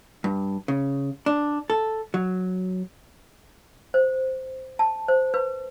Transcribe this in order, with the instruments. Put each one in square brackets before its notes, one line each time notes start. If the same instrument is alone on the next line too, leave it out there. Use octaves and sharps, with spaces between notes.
[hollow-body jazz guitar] G2
C#3
D4
A4
F#3
[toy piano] C5
A5
C5
B4